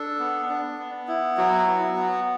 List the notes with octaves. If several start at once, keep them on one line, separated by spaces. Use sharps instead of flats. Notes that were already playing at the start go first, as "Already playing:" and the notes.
Already playing: D4 A4
B3
D4
B3
E4
F#3 F#4
B3
B3